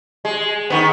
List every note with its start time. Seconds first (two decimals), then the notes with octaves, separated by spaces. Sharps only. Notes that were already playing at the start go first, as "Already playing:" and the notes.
0.25 G#3
0.70 D#3 B3